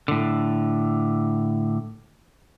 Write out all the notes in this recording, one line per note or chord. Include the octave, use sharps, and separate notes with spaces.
A2 D3